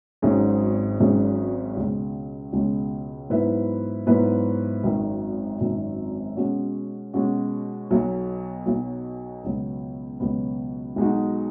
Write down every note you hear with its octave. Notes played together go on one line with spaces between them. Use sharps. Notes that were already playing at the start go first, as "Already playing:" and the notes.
G#1 G#2 F#3 C#4 G#4
G#1 G#2 F#3 C#4 G#4
C#2 B2 G#3 C#4
C#2 B2 G#3 C#4
G#2 F#3 B3 E4 B4
G#2 F#3 B3 E4 B4
G#1 F#2 D#3
G#1 F#2 D#3
B2 G#3 C#4 F#4
B2 G#3 C#4 F#4
B1 B2 F#3
B1 B2 F#3
C#2 B2 F#3 B3
C#2 B2 F#3 B3
B1 B2 G#3 D#4 F#4